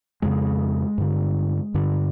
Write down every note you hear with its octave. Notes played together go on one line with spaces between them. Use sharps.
F2 C#3 G#3
G2 D3
G2 D3